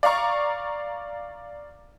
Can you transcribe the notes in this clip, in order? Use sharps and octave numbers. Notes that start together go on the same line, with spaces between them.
D5 F5 A#5 C#6